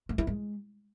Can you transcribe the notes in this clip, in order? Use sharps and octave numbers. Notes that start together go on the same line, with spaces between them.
A3
E4
G#3